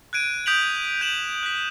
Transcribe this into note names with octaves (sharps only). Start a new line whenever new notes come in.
F#6 G#6 D7 D#7
D#6 G6 B6 D7 F7 F#7
F#7
G6 E7 F#7
F#6 B6